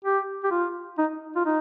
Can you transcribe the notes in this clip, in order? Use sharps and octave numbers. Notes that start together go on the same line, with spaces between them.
G4
G4
F4
D#4
F4
D#4